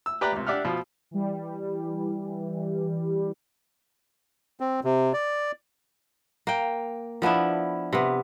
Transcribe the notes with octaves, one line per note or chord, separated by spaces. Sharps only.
E6
G4 B4 D5 A#5 D6 F#6
C#2 C3
D4 G4 D5 E5 F#5 F6
B2 F3
E3 G3
C4
C3
D5
A#3 G5
F3 B3 D4 E4
C3 B3